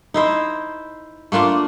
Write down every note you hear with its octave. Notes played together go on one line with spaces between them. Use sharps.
D#4 E4 C5
A3 A#3 D4 F4